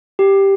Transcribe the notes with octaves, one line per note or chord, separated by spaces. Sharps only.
G4